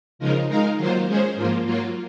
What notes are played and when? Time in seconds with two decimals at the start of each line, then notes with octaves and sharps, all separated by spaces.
0.19 C#3 F3 G#3 D#4 A#4
0.48 G#3 D#4 A#4 F5
0.77 D#3 F#3 A#3 F4 C5
1.06 G#3 C#4 G#4 C5
1.35 G#2 F3 A#3 F4
1.64 F#3 A#3 F4